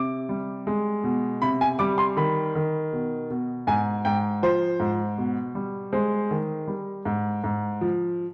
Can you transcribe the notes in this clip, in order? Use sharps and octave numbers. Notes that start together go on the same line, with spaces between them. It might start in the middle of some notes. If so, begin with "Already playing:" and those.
Already playing: C3 D6
G3
G#3
B2
C3 B5
G#5
G3 D6
C6
D#3 B5
D#3
B2
B2
G#2 G#5
G#2 G5
F3 C5
G#2
B2
G3
G#3 C5
D#3
G3
G#2
G#2
F3